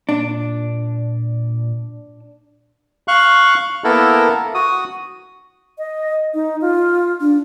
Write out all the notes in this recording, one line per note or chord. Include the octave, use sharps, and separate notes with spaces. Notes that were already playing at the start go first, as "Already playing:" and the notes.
A#2 D4
F5 C#6 F#6
A#3 B3 E4 A4 A#4
F#4 D#6
D#5
D#4
F4
D4